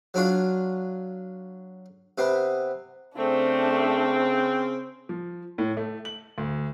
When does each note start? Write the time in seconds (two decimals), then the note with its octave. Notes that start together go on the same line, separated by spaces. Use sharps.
0.14 F#3 D4 F4
2.18 C3 B3
3.17 C#3 A3 C4 D4
5.09 F3
5.58 A2
5.77 A3
6.05 F#7
6.38 D2